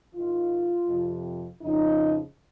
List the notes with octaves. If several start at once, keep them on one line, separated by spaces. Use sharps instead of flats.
G#2 D#3 F4
F2 C3 F3
F2 C#3 F3 D#4